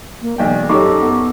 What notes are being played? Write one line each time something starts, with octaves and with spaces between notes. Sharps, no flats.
A#3
E1 B1 D5 G5
F#2 D#4 G4 A4 C#5 D#5 C#6 D6
B3